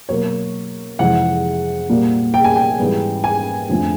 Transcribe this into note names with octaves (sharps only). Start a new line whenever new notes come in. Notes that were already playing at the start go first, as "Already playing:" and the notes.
B2 F#3 A#3 C#5
F2 C3 E3 G#3 F#5
A#2 G3 A#3
G5
G#5
G5
G#2 E3 G3 B3
G#5
F2 D3 F3 A3